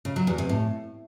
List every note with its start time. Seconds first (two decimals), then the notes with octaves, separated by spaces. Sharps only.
0.05 C#3
0.16 F#3
0.27 E2
0.38 C3
0.49 A2